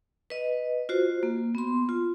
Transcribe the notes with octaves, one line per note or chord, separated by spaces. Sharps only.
B4 D#5
F4 F#4 C5
A#3
B3 C6
F4